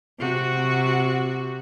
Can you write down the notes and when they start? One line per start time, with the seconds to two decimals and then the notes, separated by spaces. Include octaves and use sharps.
0.18 C3 F#4